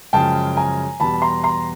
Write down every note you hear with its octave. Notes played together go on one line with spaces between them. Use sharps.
F#2 C#3 F3 G#3 G5 A5
G#5 A#5
E2 B2 G3 A5 B5
A#5 C6
A#5 C6